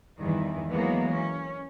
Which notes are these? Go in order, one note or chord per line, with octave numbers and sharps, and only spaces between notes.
E2 G2 D#3 E3
E3 F#3 G#3 A#3 B3
C#4